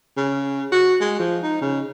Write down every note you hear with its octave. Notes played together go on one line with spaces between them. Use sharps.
C#3
F#4
G#3
F3
D#4
C#3